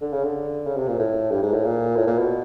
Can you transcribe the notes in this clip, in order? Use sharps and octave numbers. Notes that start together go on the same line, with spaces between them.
D3
C#3
D3
C#3
C3
A#2
A2
G2
G#2
A2
A#2
A2
A#2
B2